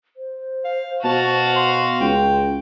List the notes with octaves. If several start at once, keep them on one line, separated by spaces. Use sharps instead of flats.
C5
F5
B2 F#4 F5 A5
C6
C#2 G5